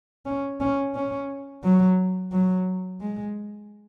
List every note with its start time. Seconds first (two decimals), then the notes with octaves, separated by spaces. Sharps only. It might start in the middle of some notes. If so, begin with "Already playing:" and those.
0.26 C#4
0.60 C#4
0.95 C#4
1.64 F#3
2.32 F#3
3.01 G#3